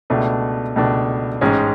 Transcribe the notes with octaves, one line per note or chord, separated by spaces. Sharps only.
C#2 B2 A3 D4
C#2 B2 A3 D4
A1 G#2 G#3 C#4